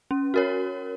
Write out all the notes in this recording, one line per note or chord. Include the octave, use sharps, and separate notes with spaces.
C#4
F#4 A#4 C#5